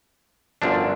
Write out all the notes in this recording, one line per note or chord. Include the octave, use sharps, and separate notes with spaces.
G1 F#2 D3 F3 D4